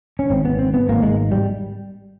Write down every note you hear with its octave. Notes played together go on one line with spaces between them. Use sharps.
C#4
G#1 G#2 C4
B3
C4
B3
G#1 G#2 A#3
G#3
G3